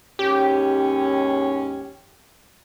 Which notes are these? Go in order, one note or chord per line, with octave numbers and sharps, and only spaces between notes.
D#2 G#2 C#4 G4